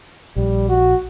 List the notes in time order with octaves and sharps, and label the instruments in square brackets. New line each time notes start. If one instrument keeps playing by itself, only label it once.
[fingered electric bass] A#1 [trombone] G3
[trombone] F#4